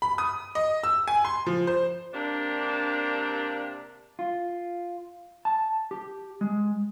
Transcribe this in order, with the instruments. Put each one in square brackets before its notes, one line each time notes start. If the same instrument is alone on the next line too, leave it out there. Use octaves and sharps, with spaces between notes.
[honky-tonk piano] B5
D#6
D#5
E6
G#5
C6
F3
C5
[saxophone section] C3 A#3 D4
[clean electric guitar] F4
A5
G4
G#3